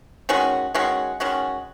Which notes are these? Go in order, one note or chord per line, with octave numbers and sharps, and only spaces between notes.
D#3 G#3 C#4 F#4
D#3 G#3 C#4 F#4
D#3 G#3 C#4 F#4